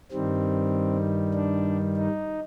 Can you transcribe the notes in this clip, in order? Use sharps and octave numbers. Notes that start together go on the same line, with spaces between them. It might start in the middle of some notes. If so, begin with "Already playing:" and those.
G2 D#3 G3 C4
D4
D#4